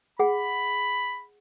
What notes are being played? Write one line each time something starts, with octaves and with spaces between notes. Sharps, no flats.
G#4 F#5 B5